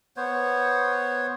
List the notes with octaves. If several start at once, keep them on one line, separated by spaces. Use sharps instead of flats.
B3 C5 C#5